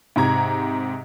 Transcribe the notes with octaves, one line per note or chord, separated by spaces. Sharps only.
G#2 C3 A#5 G#6